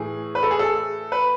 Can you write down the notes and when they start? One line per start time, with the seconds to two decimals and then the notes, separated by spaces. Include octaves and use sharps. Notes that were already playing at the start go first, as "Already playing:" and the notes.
Already playing: A2 E3 G#4
0.35 B4
0.43 A4
0.51 G#4
0.59 A4
1.12 B4